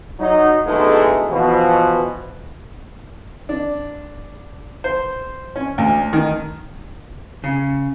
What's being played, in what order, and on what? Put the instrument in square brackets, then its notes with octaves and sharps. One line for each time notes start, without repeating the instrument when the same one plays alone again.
[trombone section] F#3 D#4
A1 B2 D3 G#3 A3 D#4
B2 E3 F3
[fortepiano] D4
C5
C#4
D2
D#3
[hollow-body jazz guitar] C#3